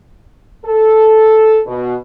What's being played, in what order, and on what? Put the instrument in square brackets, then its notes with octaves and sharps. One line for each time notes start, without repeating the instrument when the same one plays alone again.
[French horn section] A4
B2